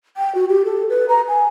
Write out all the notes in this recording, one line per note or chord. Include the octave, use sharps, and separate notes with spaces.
G5
F#4
G4
A4
B4
A#5
G#5